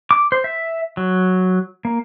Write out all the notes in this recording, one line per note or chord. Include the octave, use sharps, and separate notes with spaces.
D6
C5
E5
F#3
A#3